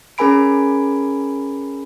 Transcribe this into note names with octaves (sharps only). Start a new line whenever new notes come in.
C#4 G#4 A#4 G#5 B5 D7